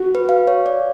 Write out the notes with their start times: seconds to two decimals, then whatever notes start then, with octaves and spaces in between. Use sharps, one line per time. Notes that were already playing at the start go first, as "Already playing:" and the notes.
Already playing: F#4
0.15 B4
0.29 F5
0.47 C#5
0.66 D5